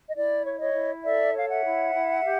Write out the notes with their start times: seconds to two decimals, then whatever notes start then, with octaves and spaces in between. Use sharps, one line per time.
0.09 D#5
0.15 E4 D5
0.44 C#5
0.59 C#5 D#5
0.74 E4
1.04 A4 D5 E5
1.35 C#5 F5
1.49 E5 F#5
1.64 E4
1.94 E4
2.24 G4